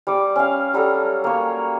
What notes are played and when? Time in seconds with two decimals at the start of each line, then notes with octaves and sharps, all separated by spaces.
0.07 G3 D5 D6
0.36 C#4 F5
0.74 F#3 G3 F#4 A4
1.24 A#3 C#5